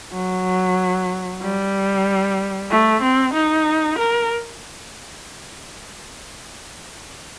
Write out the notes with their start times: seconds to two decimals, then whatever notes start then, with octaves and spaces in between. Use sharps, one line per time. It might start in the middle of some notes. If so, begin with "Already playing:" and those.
0.13 F#3
1.42 G3
2.70 A3
3.02 C4
3.34 D#4
3.99 A#4